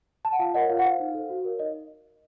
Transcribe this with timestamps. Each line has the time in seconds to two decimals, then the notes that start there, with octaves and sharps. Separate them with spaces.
0.25 A5
0.32 F#5
0.39 F4 F5
0.54 A#4 C#5 D#5 F#5
0.69 F4 F5
0.79 F#5
0.85 C5 F5
1.00 D#4
1.14 A4 C5
1.30 F#4
1.45 A#4 C#5
1.59 D#4 D#5